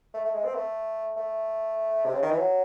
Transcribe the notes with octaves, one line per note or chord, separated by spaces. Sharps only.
A3
A3
G#3
C4
A3
A3
C3
C#3
D#3
E3
F#3